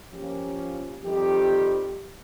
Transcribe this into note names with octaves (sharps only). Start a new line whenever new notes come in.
F3 A#3 C#4 G4
F2 D#3 G3 C4 G4